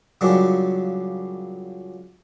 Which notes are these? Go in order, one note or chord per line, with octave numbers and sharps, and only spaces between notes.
A#2 C#3 F#3 G3 C#4 D4